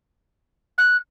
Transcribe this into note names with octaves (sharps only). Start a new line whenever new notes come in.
F#6